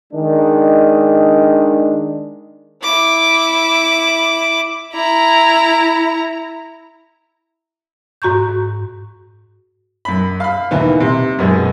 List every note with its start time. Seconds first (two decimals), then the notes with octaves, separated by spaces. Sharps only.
0.13 D#3 G#3 D4
2.83 E4 D6
4.93 E4 A#5
8.22 G#2 F#4 A#5 C#6 G6
10.05 F#2 B5
10.40 F5 B5
10.71 D#2 E3 B3
11.00 C3
11.39 F#2 B2 G#3